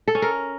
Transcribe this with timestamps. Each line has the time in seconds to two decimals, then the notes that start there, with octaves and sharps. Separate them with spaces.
0.08 A4
0.15 C#4
0.22 A#4